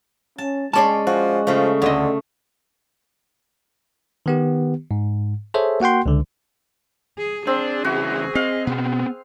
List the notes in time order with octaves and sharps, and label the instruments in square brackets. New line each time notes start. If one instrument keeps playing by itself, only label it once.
[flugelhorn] C#4 [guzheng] A5
[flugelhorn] G#3 [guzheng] C#4 D5 C6 [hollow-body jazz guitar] C#5 A5
[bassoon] F3 [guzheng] F#4
[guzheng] C#3 A3 [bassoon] F3
[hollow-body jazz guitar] D2 D#5 [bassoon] D3 [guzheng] A3
[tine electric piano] D#3 B3 G4
G#2
G#4 A4 C5 C#5 E5
A#3 F#4 F#5 G5 C6
C#2 D3
[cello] G#4
[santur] C4 [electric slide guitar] D4 [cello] G#4
[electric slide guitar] E2 C#3 E4 [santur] F#4
[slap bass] C4 [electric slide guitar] D#5 [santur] F5
[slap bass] B2 [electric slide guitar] B3 C4